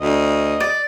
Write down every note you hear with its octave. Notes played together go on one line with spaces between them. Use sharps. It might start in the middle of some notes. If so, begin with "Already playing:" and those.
D2 D#5
D5